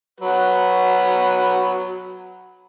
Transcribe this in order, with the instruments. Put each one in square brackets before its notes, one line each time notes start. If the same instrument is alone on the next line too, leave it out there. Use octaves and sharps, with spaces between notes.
[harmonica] F#3 F#4 B4